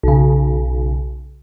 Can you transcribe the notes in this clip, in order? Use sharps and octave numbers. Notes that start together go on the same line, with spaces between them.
B1 C#3